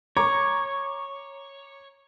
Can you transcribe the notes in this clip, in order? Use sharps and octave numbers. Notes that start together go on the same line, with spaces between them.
C#5 A#5 C#6 D6